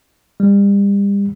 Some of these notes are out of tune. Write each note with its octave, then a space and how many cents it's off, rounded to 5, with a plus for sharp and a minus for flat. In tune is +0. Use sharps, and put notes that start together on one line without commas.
G3 +35